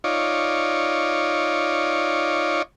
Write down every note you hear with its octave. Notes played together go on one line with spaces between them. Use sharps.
D#4 F4 C#5 D5